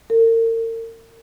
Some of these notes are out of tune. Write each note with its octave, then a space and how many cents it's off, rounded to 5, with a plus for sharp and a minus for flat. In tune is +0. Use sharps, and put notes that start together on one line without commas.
A#4 -40